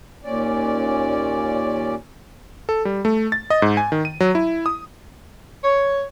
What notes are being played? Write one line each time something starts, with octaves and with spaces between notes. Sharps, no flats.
D#2 A#2 C#4 D5
A4
G3
A3
A6
D#5
G#2
G#5
D#3
D#7
F#3
E4
D#6
C#5